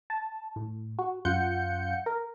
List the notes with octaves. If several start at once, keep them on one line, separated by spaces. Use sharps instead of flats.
A5
A2
F#4
F#2 F4 F#5 G6 C#7
A#4